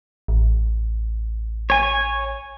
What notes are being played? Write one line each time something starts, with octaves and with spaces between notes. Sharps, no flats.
A1
C#5 G#5